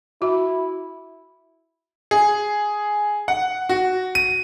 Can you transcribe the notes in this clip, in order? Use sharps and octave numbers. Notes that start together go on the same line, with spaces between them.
E4 F#4
G#4
F#5
F#4
D#7